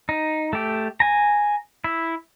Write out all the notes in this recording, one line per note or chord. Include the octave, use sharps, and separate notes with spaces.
D#4
A3 G4
G#5 A#5
E4